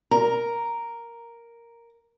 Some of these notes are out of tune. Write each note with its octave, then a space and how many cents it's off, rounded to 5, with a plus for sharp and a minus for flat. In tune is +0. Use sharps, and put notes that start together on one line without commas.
A#4 +0 A#5 +0